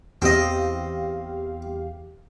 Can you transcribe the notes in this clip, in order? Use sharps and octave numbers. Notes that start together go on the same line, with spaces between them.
E2 C4 G4 D#5 F5